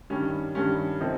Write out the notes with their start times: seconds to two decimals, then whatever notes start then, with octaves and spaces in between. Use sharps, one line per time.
0.10 G2 D#3 G3 C#4
0.55 G2 D#3 G3 C#4
1.01 C3 F3 C4 D#4